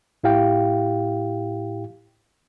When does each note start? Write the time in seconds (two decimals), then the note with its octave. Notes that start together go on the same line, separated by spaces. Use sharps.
0.24 A2 E4 G4 F5 G5